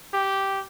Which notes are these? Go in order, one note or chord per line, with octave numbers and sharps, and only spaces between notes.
G4